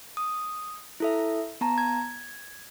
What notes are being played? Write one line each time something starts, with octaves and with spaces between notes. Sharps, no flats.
D#6
E4 A4 E5
B3 A5 A#5
G#6